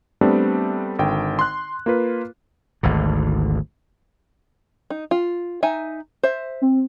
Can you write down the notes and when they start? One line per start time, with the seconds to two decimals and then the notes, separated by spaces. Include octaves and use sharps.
0.21 G3 A3 B3 C4 D4
0.99 G#1 D3 G5
1.39 C6 F#6
1.86 A#3 F4 B4
2.83 G#1 D2 D3
4.90 D#4
5.11 F4
5.63 D#4 E5 G#5
6.23 C5 E5
6.62 C4